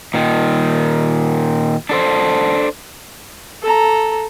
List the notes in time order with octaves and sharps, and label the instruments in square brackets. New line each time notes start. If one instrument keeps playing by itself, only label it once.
[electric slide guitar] A#2 D#3
D4 A4 C5
[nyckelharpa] A4 A#5